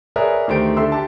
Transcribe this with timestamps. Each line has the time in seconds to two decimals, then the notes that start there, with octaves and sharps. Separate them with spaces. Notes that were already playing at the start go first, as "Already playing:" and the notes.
0.16 G#4 A#4 B4 C#5 D5 E5
0.48 D2 D#3 A3 G4 C5 D7
0.77 D3 A4 E5 C6 E6
0.92 G4 A5